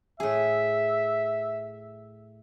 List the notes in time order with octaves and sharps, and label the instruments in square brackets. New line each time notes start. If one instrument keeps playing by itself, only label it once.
[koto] A2 G#4 [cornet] E5